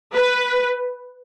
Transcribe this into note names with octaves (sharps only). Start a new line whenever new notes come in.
B4